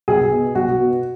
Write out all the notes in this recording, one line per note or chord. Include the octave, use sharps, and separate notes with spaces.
B1 G#4
B2
B1 F#4
B2